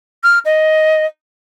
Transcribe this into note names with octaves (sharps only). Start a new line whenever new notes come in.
F6
D#5